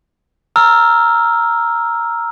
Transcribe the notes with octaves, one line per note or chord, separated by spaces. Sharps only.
A#5 E6 F6